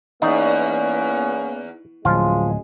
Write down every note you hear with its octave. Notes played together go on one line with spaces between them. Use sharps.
E2 A#3 B3 C#4 D#4
D1 F#2 F3 G#3 F4